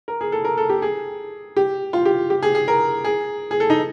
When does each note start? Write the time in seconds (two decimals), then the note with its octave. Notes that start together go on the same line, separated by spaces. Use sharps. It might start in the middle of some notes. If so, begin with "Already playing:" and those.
0.08 A#4
0.21 G#4
0.32 A4
0.45 A#4
0.58 A4
0.69 G4
0.82 G#4
1.57 G4
1.93 F4
2.05 G4
2.30 G4
2.43 G#4
2.55 G#4
2.68 A#4
3.04 G#4
3.51 G#4
3.60 A4
3.70 D#4